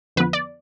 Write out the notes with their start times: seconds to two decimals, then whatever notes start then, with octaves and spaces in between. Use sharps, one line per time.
0.16 F2 D3 F3 B3 B4
0.33 D5